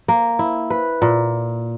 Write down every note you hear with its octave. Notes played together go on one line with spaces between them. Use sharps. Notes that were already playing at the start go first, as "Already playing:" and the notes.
A#3
E4
B4
A#2